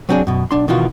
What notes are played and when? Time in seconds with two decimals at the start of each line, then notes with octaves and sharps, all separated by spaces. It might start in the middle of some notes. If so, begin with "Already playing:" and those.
0.09 F#3 B3 C4 D4 G#4
0.27 F#2 B2
0.51 B1 D4 C6
0.68 B2 D#3 E3 F4 F#4